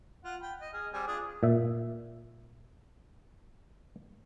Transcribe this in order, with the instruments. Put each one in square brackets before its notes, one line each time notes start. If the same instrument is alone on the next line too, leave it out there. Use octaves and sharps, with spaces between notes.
[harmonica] F4 F#5
G5 B5
D#5
G#4 F6
G3 C4 G#5
D4 F4 G#4
[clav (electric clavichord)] A#2 E5